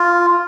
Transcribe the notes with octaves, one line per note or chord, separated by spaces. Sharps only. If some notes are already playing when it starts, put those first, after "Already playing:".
Already playing: F4